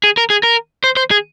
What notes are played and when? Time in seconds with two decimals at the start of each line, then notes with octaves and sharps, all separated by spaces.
0.04 G#4
0.17 A#4
0.30 G#4
0.43 A#4
0.84 C5
0.97 C5
1.11 G#4